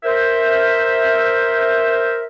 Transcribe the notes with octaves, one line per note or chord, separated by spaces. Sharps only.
A#4 C5 E5